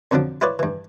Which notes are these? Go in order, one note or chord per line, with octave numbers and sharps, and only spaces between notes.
F2 D3 F3 F#3 D4
E4 F4 B4 C#5 D5
G2 E3